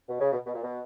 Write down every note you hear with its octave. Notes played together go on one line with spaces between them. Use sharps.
B2
C#3
B2
B2
A#2
B2